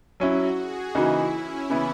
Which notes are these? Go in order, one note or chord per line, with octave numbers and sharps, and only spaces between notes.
F#3 C#4 E4 F#4
G#4
C#3 E3 A#3 D#4 E4 F#4
C#4
C#3 E3 B3 E4